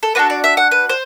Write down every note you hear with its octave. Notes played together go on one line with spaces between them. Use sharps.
A4
D4 F#4 A4 B4
D5
E5
F#5
B4
C5